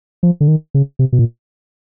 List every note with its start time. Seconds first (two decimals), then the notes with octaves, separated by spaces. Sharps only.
0.23 F3
0.40 D3
0.48 D#3
0.74 C#3
0.99 C3
1.13 B2
1.19 A#2